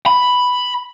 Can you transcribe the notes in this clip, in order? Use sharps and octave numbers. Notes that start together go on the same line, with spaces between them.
B5